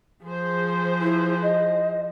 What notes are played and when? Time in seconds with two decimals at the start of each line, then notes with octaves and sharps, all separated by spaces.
0.24 F3 G#4 C5
1.00 E4
1.42 D#5